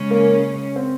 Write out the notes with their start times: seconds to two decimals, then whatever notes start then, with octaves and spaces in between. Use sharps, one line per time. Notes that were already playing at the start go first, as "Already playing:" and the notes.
Already playing: C#3 G#3 C#4
0.11 A#3
0.76 C4